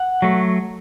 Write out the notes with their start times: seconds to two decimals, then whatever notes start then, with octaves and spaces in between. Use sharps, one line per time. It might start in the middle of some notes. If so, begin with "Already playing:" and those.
Already playing: F#5
0.22 F#3 A3